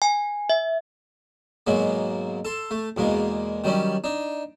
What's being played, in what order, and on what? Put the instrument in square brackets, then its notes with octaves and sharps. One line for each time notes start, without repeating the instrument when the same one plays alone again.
[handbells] G#5
E5
[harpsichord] G#2 B2 F#3 G#3 A#3
A4 C6
A3
E2 B2 G#3 A#3
D#3 F#3 G3 C#4
D4 D#4